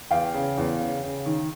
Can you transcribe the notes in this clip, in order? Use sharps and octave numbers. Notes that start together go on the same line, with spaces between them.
E2 F5 G5
C#3
E2
C#3
C#3
D#3